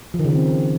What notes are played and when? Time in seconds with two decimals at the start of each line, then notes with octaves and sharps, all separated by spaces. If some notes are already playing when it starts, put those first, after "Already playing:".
0.14 F3
0.19 D#3
0.25 C#3
0.30 D#3
0.35 C4